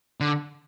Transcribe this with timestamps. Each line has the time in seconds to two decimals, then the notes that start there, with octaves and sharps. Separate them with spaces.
0.20 D3